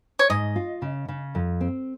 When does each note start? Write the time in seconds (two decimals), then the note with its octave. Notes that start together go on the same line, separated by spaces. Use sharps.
0.19 C#5
0.30 G#2 D#5
0.56 F4
0.82 C#3
1.08 C#3
1.35 F2
1.61 C4